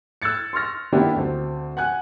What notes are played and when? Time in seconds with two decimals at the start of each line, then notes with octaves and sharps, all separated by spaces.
0.22 E6 F#6 G#6 A6 C#7
0.53 C6 C#6 F6 A#6
0.92 D#3 A#3 B3 D4 E4 G4
1.16 D2 C4
1.77 F#5 G#5 F#6